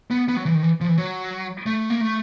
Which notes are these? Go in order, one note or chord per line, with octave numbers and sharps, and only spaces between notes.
B3
B3
F#3
E3
D#3
E3
F3
E3
F#3
A3
A#3
A3